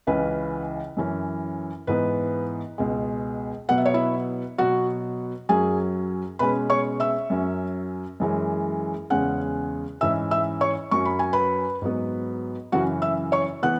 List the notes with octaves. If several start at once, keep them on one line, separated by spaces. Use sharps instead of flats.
C#2 C#3 E3 C#4 B4
F#2 E3 C#4
G#2 E3 B3 B4
C#2 B2 G#3
B2 F#3 B3 F#5
E5
C#5
E4 E5
B2 F#3 B3 F#4 F#5
F#2 F#3 C#4 G#4 G#5
B2 G#3 C#4 B4 B5
C#5 C#6
E5 E6
F#2 F#3 C#4
F#2 E3 G#3 C#4
E2 C#3 G#3 C#4 F#5 F#6
G#2 E3 C#4 E5 E6
E5 E6
C#5 C#6
F#2 F#3 C#4 C#6
B5
G#5
B4 B5
G#2 F#3 B3
F#2 C#3 E3 C#4 F#4 F#5
E5 E6
C#5 C#6
E3 B3 F#5 F#6